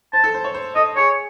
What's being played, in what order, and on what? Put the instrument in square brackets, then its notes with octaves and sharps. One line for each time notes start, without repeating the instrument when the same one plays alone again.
[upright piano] C5 [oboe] A5
[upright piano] A4
C5
C#5
C5
[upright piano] A4 [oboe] D#5
[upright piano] G#4 [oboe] C#5